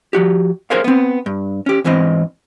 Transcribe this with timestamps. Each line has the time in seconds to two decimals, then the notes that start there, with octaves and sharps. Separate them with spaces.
0.13 F3 F#4 G4
0.70 G#4 A#4 C5 C#5 F5
0.84 B3 C4
1.26 G2
1.66 C#4 G4
1.84 E2 G#2 E3 C4 D#5